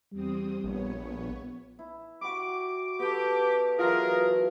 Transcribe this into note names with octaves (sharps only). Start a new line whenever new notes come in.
E2 G3 C4 D#6
A#1 B3 C#5
E4
F#4 G4 B5 D6
B3 G4 A4
E3 F#3 F4 G#4 A#4 E5